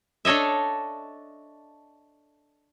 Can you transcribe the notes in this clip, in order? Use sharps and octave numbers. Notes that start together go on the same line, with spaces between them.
D4 A4 C#5 D#5 E5